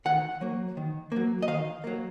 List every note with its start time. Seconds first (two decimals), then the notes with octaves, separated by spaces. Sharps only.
0.05 D#3 F#5
0.41 F#3 A#3
0.77 D#3
1.12 F#3 A#3
1.42 D#5
1.48 D#3 F5
1.84 F#3 A#3